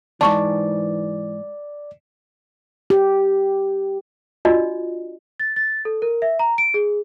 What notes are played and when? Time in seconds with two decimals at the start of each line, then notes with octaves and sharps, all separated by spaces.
0.21 D#2 G#2 E3 D5 A5 C#6
2.90 G4
4.45 D4 F4 F#4 D5 D#5
5.40 A6
5.56 A6
5.85 A4
6.02 A#4
6.22 E5
6.39 A#5
6.58 D7
6.74 G#4